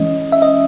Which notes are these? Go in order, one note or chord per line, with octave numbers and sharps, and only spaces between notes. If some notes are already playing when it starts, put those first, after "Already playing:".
Already playing: E3 G#3 C#4 D#5
E5
D#5